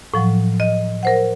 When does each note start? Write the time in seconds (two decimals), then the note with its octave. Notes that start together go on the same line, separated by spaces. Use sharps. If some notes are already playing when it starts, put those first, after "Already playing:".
0.14 A2 F3 F#3
0.60 D#5
1.03 A#4 C5 F#5